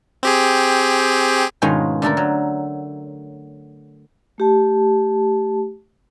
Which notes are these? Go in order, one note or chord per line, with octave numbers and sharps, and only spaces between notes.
C4 G4 G#4
G#2 B2 D#3 G#3 C#4 F4
D3 A3 A4 A#4
F#3
A3 G4 A5